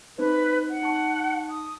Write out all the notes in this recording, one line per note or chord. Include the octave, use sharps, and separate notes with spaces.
C4 D#4 B4 C5
F#5
D#4 A5 C#6
D#6